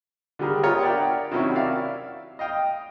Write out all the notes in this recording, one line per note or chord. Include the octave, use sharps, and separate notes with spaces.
D3 G3 G4 G#4 A#4
F4 G4 A#4 C#5 A#5 D#6
A#4 D5 E5 F#5 G5
C3 D#3 F#3 C#4 E4 F#4
D5 E5 F5
D#5 F5 G5 D#6